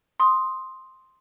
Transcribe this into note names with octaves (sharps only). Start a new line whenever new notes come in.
C6 D#6